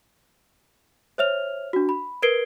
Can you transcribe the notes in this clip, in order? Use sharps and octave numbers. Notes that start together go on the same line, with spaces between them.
C5 C#5 E5 F6 F7
D4 F#4
B5
A#4 B4 G#6 C7 D7 G7